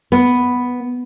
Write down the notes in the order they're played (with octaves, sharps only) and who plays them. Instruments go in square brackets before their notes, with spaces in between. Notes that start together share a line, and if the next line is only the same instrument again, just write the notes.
[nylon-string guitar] B3